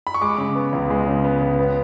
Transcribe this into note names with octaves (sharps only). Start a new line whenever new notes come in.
B5
C#6
G#3 D6
C#3
B3
C#2
G#3
C#3
B3
C#2
B3